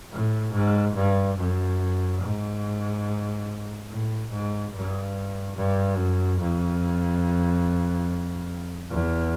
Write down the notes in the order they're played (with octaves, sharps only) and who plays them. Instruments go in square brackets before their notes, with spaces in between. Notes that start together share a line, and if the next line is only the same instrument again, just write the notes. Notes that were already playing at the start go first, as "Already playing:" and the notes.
[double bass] A2
G#2
G2
F#2
G#2
A2
G#2
G2
G2
F#2
F2
E2